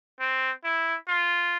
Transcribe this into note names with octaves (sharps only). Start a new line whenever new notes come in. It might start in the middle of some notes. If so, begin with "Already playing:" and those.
C4
E4
F4